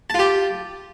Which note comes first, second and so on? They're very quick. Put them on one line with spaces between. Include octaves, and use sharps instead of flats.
A5 F4 G4